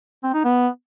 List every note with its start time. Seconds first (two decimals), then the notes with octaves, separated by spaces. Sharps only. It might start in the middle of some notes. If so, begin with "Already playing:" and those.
0.23 C4
0.34 D#4
0.44 B3